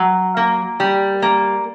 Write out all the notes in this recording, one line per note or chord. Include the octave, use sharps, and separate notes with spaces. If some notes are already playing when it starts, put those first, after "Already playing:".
Already playing: F#3
A#3
G3
A#3